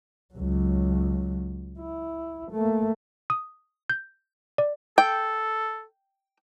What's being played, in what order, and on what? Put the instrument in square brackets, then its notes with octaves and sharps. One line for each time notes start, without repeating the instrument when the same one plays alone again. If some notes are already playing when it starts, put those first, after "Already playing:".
[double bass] C#2 F#3
E4
A3 A#3
[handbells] D#6
G6
D5
[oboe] A4 [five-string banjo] G5